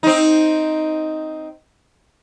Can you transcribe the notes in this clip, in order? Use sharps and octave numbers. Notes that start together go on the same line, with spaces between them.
C4 D#4